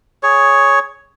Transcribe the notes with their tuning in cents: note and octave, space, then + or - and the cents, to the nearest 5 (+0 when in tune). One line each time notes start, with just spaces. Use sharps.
G#4 +0 C#5 +5